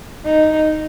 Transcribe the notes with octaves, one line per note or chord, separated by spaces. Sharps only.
D#4